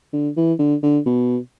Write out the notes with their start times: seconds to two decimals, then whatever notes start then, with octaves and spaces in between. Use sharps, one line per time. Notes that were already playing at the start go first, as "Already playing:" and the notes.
0.13 D3
0.37 E3
0.59 D3
0.83 D3
1.06 B2